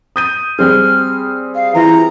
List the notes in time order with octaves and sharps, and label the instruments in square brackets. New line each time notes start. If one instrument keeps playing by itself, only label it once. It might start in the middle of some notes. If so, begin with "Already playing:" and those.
[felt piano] D#6 G6 D#7
[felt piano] G3 C4 G#4 [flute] F6
[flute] F5
[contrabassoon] E3 [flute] F4 [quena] A#5